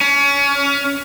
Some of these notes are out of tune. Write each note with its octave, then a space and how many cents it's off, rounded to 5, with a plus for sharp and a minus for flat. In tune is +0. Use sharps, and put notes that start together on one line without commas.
C#4 +25